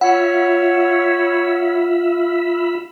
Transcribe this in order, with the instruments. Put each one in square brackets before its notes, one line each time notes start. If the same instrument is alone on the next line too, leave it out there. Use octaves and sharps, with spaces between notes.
[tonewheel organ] F4 E5 B5 [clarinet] C#5 [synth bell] F#5